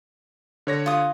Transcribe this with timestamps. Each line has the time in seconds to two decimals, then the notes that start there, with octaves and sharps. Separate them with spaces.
0.67 D3 C#5 A#6
0.86 F4 D#6